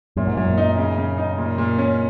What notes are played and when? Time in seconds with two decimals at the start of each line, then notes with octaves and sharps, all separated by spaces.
0.16 F#2 A#2
0.27 G#2
0.37 F#2 A#2
0.57 D#4
0.77 C#3
0.98 C#3
1.18 D#4
1.38 A#2
1.58 A#2
1.78 C#4